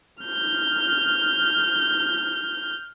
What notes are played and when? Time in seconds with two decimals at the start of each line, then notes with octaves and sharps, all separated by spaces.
0.23 F6 G6